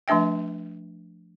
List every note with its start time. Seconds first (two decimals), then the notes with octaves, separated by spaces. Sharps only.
0.08 F3 A3 D4 E5 G5